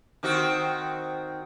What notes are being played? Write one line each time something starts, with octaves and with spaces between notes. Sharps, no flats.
D#3 C4 F#4